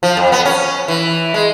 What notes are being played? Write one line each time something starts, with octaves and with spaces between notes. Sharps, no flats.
F3
F2
B3
C#4
E3
G#3